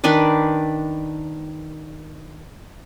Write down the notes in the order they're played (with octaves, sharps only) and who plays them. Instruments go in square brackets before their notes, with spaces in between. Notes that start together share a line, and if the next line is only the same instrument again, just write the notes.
[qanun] D#3 D4 B4 D5